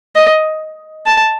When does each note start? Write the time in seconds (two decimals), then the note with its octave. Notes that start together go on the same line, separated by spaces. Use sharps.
0.15 D#5
1.06 A5